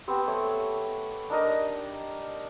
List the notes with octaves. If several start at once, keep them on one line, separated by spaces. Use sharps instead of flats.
B3 C4 G4
A3 C#5
D4 D#4 A#4 D#5